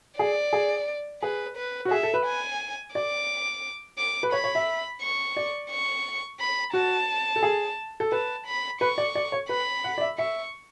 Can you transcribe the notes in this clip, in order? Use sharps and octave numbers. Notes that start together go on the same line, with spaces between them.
G#4 D5
G#4
G#4 B4
B4
F#4
G#4 E5
A4
B4
G#5
D5 D6
D6
B4
C#5 B5
C#5
E5
C#6
D5
C#6
B5
F#4 A5
A4
G#4
A4
B4 A5
B5
B4 C#6
D5
D5
C#5
B4 B5
F#5
D5
E5
E5 C#6